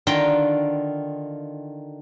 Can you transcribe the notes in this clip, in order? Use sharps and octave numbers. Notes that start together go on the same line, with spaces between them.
D3 D#3 F4 G5 A#5